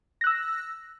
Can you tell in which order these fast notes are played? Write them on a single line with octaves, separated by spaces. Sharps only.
A#6 F#6 E6